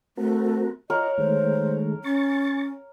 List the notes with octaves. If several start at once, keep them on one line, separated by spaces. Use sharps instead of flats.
A3 C4 F#4 A#4
F4 A#4 C#5 D#5 F#5
D#3 G#3 A3 C5
C#4 C#6 A6